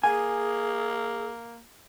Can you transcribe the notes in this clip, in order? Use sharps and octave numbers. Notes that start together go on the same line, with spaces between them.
A#3 G#4 G#5